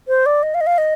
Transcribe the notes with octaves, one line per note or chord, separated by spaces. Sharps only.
C5
D5
D#5
F5
D#5
F5
D#5